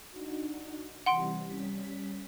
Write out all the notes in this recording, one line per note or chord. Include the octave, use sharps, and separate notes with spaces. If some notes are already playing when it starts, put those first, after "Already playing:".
D4 D#4 F#4
C3 E3 G3 F#5 C6 D7
G3 C#4 B6